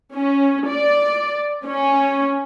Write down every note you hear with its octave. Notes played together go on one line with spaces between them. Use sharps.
C#4
D5
C#4